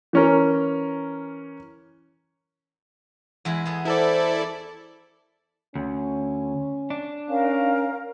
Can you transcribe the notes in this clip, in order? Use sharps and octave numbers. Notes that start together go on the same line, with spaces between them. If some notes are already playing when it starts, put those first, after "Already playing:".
E3 C#4 A#4
E2 G#3 E4
B3 G#4 A4
E4 A4 A#4 C5 D5
D2 C#4
D4
C#4 A#4 F5